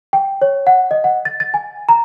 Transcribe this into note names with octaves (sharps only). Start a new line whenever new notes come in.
G5
C#5
F#5
D#5
F#5
A6
A6
G#5
A#5